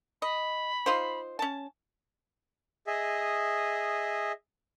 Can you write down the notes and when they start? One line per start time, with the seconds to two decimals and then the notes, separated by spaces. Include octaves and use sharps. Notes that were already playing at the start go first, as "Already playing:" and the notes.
0.22 D#5 B5
0.86 D#4 F4 C5
1.39 C#4 A5
2.87 G#4 D#5 E5